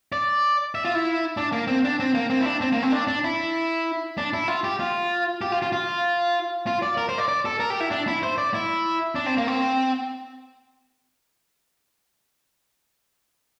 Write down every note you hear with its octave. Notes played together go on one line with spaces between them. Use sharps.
D5
E5
F4
E4
D4
A#3
C4
D4
C4
A#3
C4
E4
D4
C4
A#3
C4
D4
D4
E4
D4
E4
F4
G4
F4
G4
F4
F4
F4
F4
D5
A#4
C5
D5
D5
A4
A#4
G4
E4
D4
E4
C5
D5
E4
D4
C4
A#3
C4